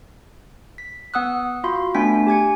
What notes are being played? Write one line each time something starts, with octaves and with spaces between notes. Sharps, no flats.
B6
B3 F#5 D#6 E6 F#6
F4 F#4 F5 B5 C6
A3 B3 D4 G5 G#5 B6
G4 G#5 G#6 C#7